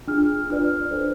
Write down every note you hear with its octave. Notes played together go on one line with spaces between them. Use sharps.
D4 F4 G#4 F6
D4 F4 B4 D5 F6
D4 A4 C5